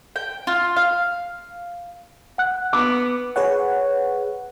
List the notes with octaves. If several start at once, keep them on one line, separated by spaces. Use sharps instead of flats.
G5
F4
F5
F#5 F#6
B3 D6
G#4 B4 C#5 F#5